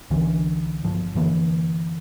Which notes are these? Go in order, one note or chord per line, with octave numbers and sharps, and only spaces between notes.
C2 D3 E3 C#4
G1 F3
F#2 D3 E3 A#3